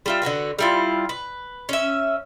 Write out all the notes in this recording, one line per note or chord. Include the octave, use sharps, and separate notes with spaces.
G3 F4 E5
D3 E4 F#4 B4
G3 E4 F4
B4
C#4 E5